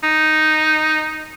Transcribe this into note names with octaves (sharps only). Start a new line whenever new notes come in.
D#4